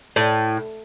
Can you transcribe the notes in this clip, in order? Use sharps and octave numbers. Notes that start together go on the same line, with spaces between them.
A2